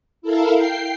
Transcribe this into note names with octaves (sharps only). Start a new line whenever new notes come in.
E4 A4 A#4 F5
G5 C7